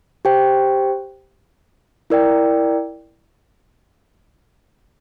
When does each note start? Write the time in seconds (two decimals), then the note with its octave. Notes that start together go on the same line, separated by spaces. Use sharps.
0.25 G4 C5 G5
2.10 E4 A#4 D5 G5